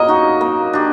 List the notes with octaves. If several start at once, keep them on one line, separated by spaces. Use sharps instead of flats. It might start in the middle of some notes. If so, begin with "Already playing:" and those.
Already playing: F#3 A#3 D#5
D#4 F#4
A#3
D4 G4